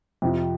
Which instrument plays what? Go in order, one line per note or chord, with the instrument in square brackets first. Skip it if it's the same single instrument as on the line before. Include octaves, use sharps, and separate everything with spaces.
[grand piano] F2 C3 F3